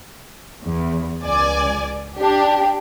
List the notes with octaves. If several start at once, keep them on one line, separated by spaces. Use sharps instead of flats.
E2
C#2 D5 G#5
D4 G4